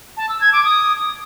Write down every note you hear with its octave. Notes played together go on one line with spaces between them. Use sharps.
A5
E6
G#6
D6
D#6